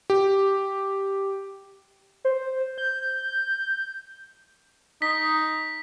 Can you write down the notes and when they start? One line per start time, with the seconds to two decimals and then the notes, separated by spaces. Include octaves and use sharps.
0.10 G4
2.25 C5
2.78 G6
5.02 D#4 B6